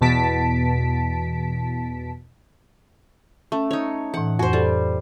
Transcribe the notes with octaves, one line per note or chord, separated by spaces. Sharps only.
E2 B2 A5 B6 D7
A3 C#4
D#4 C#5
A2 E3 F#5
F2 F#4 C5
G3 A4